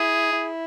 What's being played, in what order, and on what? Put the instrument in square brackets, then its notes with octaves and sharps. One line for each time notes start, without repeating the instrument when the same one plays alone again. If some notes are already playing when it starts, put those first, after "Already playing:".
Already playing: [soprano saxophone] E4 [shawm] G#4
[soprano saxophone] E4